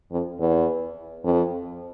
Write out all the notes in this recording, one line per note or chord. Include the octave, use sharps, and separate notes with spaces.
F2
E2
F2